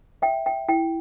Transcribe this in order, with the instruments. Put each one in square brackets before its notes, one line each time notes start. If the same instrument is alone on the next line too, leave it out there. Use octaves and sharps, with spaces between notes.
[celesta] E5 [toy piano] G5
[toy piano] G5
[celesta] E4 [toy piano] G5